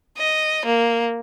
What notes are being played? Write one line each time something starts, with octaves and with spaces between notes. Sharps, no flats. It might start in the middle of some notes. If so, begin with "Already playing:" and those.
D#5
A#3